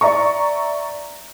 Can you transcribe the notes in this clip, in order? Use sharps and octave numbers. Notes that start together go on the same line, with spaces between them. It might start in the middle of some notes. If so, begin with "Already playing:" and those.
D5 E5 A#5 C#6